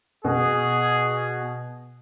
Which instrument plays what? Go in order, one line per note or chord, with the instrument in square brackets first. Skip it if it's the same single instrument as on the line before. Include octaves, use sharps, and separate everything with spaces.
[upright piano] B2 [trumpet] G#4